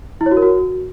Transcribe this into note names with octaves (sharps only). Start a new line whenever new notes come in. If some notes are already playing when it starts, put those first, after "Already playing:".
E4
C#5
F#4
A#4
F#4